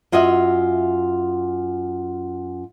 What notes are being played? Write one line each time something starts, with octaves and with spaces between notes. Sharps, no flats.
F#2 F4 F#4 D#5 E5